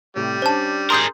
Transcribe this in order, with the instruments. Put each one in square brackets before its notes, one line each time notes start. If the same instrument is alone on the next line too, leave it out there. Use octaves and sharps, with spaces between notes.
[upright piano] A2 C3 [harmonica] G3
[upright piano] C#4 D4 [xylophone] C5 A5
[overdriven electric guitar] G#4 A#4 [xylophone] C6 D#6 G6